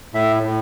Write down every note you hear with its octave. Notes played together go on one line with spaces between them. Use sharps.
A2 E5
A2